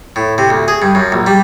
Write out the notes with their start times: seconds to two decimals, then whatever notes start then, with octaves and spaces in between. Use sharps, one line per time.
0.16 A2
0.38 C3
0.50 D2
0.68 G#4
0.82 G2
0.95 F#2
1.12 A#1
1.27 G3